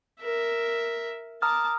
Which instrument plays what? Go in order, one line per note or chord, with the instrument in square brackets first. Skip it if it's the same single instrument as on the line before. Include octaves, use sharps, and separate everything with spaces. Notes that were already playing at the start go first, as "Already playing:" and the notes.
[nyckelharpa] A#4 E5
[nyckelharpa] A5 D6 [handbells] A#5 D#6 F6